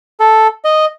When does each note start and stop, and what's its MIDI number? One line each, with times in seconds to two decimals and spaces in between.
0.20 0.47 69
0.65 0.85 75